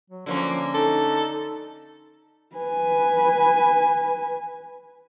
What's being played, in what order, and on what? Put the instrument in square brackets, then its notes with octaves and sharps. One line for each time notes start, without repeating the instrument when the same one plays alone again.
[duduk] F#3
[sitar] D3 A#3 C#4 [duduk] F3
[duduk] D#4 [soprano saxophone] A4
[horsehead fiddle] B4 G#5